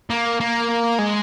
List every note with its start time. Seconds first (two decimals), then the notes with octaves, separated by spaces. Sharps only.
0.10 A#3
0.40 A#3
0.99 G#3